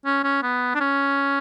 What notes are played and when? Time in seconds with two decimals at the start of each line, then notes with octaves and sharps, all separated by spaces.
0.05 C#4
0.24 C#4
0.43 B3
0.75 D4
0.81 C#4